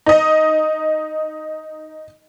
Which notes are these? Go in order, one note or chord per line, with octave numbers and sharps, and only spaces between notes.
D#4 D#5